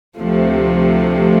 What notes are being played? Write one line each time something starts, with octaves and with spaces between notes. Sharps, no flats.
D2 C3 F3 A3